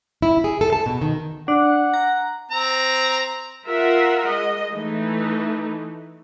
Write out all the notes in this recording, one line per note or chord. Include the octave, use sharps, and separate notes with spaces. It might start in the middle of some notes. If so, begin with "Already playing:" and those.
E4
G#4
A4
A5
B2
D#3
D4 F#5
A#5
C4 A#5
F4 A#4 E5 F#5
G#3 D#5
E3 A3 D#4